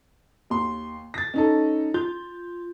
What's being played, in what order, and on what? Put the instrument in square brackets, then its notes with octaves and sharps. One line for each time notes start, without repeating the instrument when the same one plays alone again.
[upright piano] D#2 C6
A6 A#6
C#4 D#4 A4
[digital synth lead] F4 [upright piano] G6